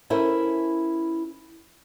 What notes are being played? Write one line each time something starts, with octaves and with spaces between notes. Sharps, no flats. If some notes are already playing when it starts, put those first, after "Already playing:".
C#4 E4 A4 A#4 C5 E5